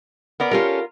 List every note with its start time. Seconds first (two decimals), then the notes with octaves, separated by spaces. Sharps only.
0.40 B3 A#4 D5
0.51 C#4 F4 G4 A4 A#4